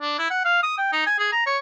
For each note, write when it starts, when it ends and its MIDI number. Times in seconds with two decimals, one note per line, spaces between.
0.01 0.15 62
0.19 0.26 64
0.30 0.42 78
0.45 0.62 77
0.63 0.75 87
0.78 0.92 79
0.92 1.04 63
1.07 1.18 80
1.19 1.31 68
1.32 1.45 82
1.46 1.58 73